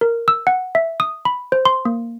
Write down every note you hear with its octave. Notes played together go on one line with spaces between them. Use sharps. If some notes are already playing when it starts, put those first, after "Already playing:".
A#4
E6
F#5
E5
D#6
B5
C5
C6
A#3